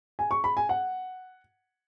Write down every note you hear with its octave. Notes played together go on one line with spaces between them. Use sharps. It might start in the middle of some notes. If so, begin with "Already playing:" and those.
G#5
C#6
B5
G#5
F#5